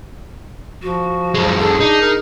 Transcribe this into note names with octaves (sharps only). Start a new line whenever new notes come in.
F3 F#4
F#2 G#3
G#4 A4
D4 D#4
A#4